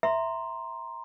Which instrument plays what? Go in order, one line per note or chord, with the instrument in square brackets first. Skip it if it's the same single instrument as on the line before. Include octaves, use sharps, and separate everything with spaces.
[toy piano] E5 [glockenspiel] A#5 C6